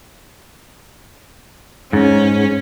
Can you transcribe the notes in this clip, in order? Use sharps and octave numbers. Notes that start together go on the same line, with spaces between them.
G#2 C#4